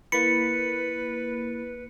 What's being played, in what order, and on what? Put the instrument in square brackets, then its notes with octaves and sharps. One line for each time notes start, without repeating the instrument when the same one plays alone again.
[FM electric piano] A#3 B5 [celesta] E4 A6 [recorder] B4 [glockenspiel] C#7